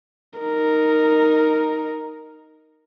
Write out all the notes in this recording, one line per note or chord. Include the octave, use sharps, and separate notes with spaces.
D#4 A#4